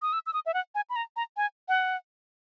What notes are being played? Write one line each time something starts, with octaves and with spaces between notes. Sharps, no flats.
D#6
E6
E6
D#6
E5
F#5
G#5
B5
A#5
A#5
G#5
F#5